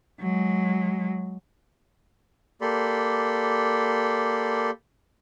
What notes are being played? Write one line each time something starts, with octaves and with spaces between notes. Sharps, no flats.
F#3 G#3
A#3 G4 A4 D5 B5 C6